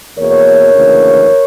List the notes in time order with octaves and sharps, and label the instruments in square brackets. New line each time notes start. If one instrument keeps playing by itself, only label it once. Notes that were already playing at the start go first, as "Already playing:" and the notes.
[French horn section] E2 B2 A#3 A#4 C#5
D2 C#3 E3 A#3